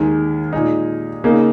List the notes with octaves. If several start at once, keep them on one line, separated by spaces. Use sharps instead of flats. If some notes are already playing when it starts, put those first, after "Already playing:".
Already playing: D#2 D#3 G#3
A#2 G#3 D#4
C#3 A#3 D#4